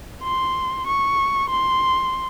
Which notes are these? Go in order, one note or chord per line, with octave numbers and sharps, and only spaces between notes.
C6
C#6
C6